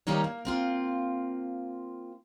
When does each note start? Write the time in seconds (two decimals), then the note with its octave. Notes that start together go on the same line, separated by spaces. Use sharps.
0.07 D#3 G3 A#3 D#4 C#5
0.24 A#3
0.45 A#3 C4 F4